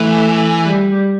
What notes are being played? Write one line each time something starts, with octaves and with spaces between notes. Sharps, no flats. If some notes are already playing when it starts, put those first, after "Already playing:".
Already playing: E3 A3
G3